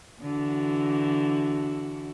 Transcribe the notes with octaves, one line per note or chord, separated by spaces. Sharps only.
D3 E3 F#4